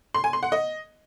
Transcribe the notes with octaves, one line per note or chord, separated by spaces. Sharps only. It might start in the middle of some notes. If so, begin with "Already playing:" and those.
C6
G#5
C6
F#5
D#5